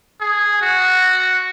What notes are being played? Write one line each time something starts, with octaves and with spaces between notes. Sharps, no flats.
G#4
F#4